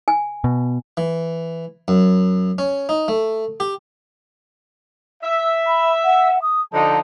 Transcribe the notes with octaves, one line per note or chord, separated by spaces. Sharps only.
G#5
B2
E3
F#2
C#4
D#4
A3
G4
E5
B5
F#5
D#6
D3 F3 D#4 A5